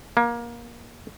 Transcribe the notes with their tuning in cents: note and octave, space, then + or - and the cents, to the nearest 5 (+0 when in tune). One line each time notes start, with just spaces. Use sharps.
A#3 +20